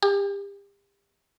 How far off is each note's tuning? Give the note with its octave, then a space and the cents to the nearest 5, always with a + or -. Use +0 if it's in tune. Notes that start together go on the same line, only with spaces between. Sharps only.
G4 +35